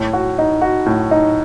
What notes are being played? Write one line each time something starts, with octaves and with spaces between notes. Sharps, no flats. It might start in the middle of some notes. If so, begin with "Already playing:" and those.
Already playing: A2
F#4
D#4
F#4
A2
D#4